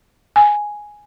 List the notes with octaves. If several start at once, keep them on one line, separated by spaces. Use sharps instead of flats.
G#5